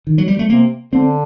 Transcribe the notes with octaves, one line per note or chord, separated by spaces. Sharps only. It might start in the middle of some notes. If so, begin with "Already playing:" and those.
D#3
F#3
G3
A3
C3 A#3
D3 C4